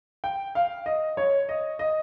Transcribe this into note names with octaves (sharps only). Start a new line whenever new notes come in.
G5
F5
D#5
C#5
D#5
D#5